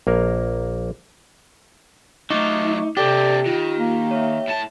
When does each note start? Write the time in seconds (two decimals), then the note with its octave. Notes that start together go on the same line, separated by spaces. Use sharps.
0.07 A#1 A#3 A#4
2.30 F#3 A3 D#4 F4 C#6 D6
2.97 C3 C4 D4 G4 A4 D5 D6
3.46 D#3 F4
3.78 A#3
4.11 C#5 E5
4.48 A2 A5